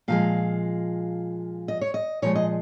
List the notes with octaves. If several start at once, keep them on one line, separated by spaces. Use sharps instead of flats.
A#2 F3 G#3 F5
D#5
C#5
D#5
A#2 F3 G#3 C#5
D#5